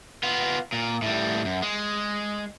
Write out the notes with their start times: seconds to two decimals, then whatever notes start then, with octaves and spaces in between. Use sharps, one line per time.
0.23 B3 F4
0.73 A#2
1.02 A2 G3
1.45 F#2
1.62 G#3